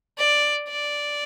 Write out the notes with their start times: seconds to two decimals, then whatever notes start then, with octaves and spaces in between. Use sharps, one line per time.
0.18 D5
0.68 D5